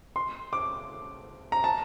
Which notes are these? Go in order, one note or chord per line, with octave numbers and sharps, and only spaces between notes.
C6
D6
A#5
A5